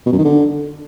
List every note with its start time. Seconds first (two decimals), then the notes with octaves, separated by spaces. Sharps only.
0.06 B2
0.12 F#2
0.19 D#3
0.25 D3